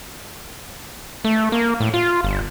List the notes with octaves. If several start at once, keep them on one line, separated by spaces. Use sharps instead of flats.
A3
A#3
A2
F4
G1